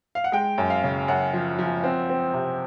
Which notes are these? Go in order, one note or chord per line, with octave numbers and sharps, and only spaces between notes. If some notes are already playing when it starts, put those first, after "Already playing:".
F5
F#5
G#3 G5
F#2
F5
C#3
F#2 F#5
F3
F3
C4
C4
C3